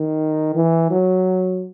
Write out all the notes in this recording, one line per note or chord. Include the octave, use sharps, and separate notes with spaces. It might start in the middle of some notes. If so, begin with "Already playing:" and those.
Already playing: D#3
E3
F#3